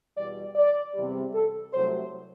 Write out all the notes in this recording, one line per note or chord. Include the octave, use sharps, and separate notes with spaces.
E2 B2 G3 D5
D5
E2 C3 G3
A4
C2 C3 F#3 A3 C5